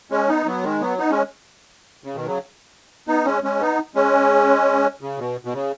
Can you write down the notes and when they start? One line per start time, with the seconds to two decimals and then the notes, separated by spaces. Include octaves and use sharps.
0.11 G#3 C#4
0.29 B3 D#4
0.46 F#3 B3
0.63 D#3 G#3
0.81 F#3 B3
0.98 B3 D#4
1.10 G#3 C#4
2.04 C#3
2.15 B2 D#3
2.26 C#3 F#3
3.08 B3 D#4
3.26 G#3 C#4
3.43 G#3 C#4
3.60 B3 D#4
3.95 G#3 C#4
5.01 C#3
5.18 B2
5.45 B2
5.54 C#3